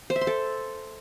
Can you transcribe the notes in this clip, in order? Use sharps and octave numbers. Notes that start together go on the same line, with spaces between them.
C5
E5
C6
A4